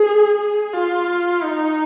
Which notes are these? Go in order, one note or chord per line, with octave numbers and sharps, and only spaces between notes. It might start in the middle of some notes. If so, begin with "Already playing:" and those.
Already playing: G#4
G#4
F4
D#4